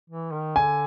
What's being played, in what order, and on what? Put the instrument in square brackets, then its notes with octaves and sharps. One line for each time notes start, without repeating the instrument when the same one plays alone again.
[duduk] E3
D#3
[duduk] D3 [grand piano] G#5